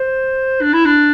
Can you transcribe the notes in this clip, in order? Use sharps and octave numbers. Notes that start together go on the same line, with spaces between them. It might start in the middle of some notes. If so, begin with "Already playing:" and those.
Already playing: C5
D4
E4
D4